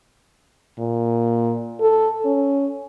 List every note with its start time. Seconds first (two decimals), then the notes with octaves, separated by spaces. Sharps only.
0.79 A#2
1.80 A4
2.26 C#4